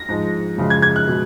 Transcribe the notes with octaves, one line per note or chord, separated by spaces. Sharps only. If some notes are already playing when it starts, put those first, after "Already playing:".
Already playing: A#6
G#2 F3 G#3
F#2 C#3 F3 G#3
G#6
G#6
F#6
B2 G#3